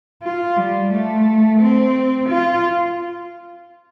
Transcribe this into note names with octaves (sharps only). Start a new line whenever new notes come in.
F4
G3
A3
C4
F4